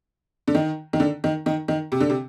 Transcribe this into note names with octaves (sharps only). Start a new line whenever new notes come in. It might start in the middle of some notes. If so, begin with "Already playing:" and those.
D3
D#3
D#3
D3
D#3
D#3
D#3
C3
D3
C3